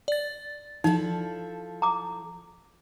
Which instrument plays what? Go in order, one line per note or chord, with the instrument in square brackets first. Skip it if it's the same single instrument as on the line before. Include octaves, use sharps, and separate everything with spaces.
[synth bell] D5 A6
[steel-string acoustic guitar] F3 E4 A4 [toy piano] D#4
[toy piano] A#5 D6